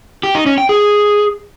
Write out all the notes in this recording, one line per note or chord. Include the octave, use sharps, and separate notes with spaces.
G4
D#4
C#4
G5
G#4